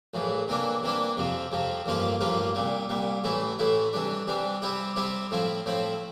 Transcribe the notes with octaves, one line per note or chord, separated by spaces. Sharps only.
A#1 A2 E3
C3 E3 A#3 D4
C3 E3 A#3 D4
F2 C3 F3
F2 C3 F3
A1 G2 F3 A#3 F4
A1 G2 F3 A#3 F4
C2 A#2 G3
C2 A#2 G3
A1 A2 E3 A3 E4
A1 A2 E3 A3 E4
C3 E3 G3 D4
C3 E3 G3 D4
C3 G3 C4 E4 G4
C3 G3 C4 E4 G4
A2 F3 C4 E4
A2 F3 C4 E4